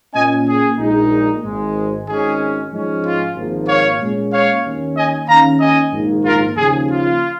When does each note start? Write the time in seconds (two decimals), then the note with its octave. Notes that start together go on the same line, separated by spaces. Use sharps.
0.14 A#2 A#3 C#4 D#5 G#5
0.46 G#4
0.78 A#1 A#2 G#3 D#4
1.42 G#1 G#2 G#3
2.06 G#1 G#2 G#3 C#4 G#4
2.71 G#2 F3 G#3 C#4
3.04 F4
3.35 G#1 G#2 F3 A#3
3.68 C#5 F5
4.00 A#2 G#3 C#4
4.32 C#5 F5
4.64 D#2 D#3 C#4
4.96 D#5 G#5
5.28 D#2 D#3 C#4 F5 A#5
5.60 D#5 G#5
5.93 A#1 G#2 D#3 A#3
6.24 F4 A#4
6.57 D#2 C#3 F3 G#4
6.90 F4